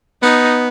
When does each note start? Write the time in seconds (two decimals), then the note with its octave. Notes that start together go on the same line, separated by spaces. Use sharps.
0.23 B3 D#4